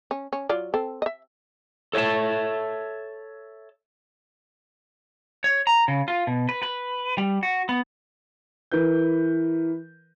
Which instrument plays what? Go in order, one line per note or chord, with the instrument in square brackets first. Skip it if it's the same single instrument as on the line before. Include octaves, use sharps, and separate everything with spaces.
[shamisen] C#4
C#4
F#3 F4 D5
C4 A4
D#5 E5
[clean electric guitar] A4 C#5 D#5 E5 A5
[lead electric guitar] C#5
A#5
C#3
F4
B2
B4
B4
G3
F#4
B3
[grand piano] E3 A#4 B4 G6